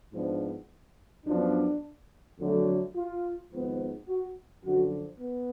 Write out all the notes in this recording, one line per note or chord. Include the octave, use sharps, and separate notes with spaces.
G#2 F3 B3 D4
F#2 F3 B3 D4
F2 D3 F#3 A3
F4
G#1 G#2 F3 B3
F#4
F#2 D3 F3 F#4
B3